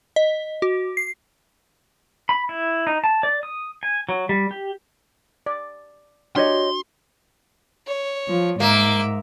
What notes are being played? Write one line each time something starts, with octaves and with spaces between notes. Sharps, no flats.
D#5
F#4
C7
B5
E4
D#4
A5
D5
D#6
G#5
F#3
G3
G4
D5
D4 F#4 G4 C#5 D#5 C6
C#5
F3
G#2 A#3 E5 D6